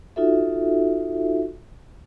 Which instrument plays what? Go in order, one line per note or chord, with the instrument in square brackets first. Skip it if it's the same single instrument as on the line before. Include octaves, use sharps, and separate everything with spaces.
[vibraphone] D#4 F4 F#4 A4 E5